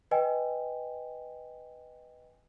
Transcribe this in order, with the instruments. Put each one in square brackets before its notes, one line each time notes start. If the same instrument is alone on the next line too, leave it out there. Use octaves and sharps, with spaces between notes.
[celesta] B4 D#5 G5 G#5